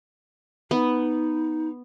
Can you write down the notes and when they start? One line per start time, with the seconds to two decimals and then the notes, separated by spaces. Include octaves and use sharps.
0.71 B3 D#4